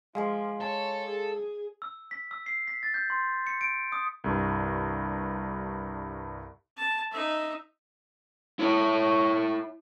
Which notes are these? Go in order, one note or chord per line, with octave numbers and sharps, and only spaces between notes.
F3 G#3 F5 G#5 C6
A4 C#5
G#4
E6
B6
E6
C7
B6
A6
G6
C6
C#7
D7
D#6
C2 G2
A5
D#4 E5
E4 C#5